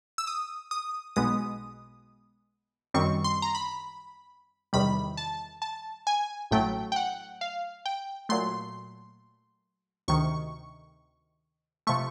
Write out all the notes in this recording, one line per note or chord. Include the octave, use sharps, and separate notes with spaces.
E6
D#6
D#6
B1 B2 G#3 B3 D#6
F#2 D#3 G3 C4 C#6
C6
A#5
B5
E2 C3 D#3 G3 B5
A5
A5
G#5
A1 A2 F#3 A3 G5
G5
F#5
F5
G5
A#2 F#3 A3 C6
D2 C3 D#3 C#6
C3 F3 A3 C#6